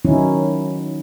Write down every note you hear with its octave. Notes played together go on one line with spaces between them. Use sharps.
D#3 F#3 C#4 D#4 E4